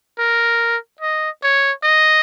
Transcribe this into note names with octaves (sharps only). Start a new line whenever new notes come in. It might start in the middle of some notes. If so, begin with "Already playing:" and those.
A#4
D#5
C#5
D#5